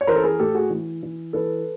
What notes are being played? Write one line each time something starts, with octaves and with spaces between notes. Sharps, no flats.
C#5
E3 A#4 C5
A4
G#4 A#4
A2 G4 A4
F#4 G#4
E3
E3
E3 A4 B4